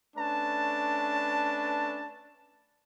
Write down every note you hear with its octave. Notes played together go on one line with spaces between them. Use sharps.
A3 C#4 D4 B4 A5